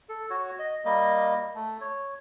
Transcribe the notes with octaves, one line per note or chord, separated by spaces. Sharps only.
A4
F#4 C#5
D#5
G3 A#3 D#5
A3
C#5